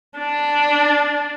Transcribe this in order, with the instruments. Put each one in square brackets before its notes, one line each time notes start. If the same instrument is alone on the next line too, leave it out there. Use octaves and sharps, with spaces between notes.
[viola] D4